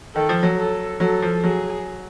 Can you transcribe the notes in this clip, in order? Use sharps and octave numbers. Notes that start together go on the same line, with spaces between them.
D#3 A4
F3
F#3
A4
F#3 A4
F3
F#3 G#4